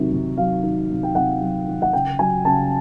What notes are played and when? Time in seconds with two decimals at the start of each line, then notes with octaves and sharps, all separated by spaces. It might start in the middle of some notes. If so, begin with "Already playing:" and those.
Already playing: C3 D#3 F#3
0.12 C3
0.37 F#3 F5
0.63 D#3
0.90 C3
1.03 G5
1.15 C3 F#5
1.41 F#3
1.67 D#3
1.82 F#5
1.93 C#3 G5
2.19 F#3 G#5
2.45 C#3 A5